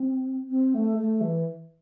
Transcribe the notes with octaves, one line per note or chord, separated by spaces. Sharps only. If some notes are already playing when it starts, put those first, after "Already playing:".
Already playing: C4
C4
A3
A3
E3